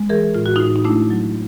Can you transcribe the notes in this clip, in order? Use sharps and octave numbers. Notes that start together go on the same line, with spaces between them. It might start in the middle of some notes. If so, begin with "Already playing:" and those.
Already playing: G#3
E3 G#4 A#4
A2 F4
F#4
A2 D#4 F4
D#4
A3 D4 E4
F#3